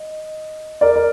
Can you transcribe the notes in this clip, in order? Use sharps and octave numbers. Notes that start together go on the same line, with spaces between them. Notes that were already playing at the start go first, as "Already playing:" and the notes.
Already playing: D#5
A#4 D5
A#4